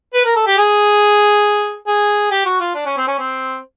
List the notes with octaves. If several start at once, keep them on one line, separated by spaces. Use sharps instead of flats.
B4
A#4
A4
G4
G#4
G#4
G4
F#4
F4
D4
C#4
C4
C#4
C4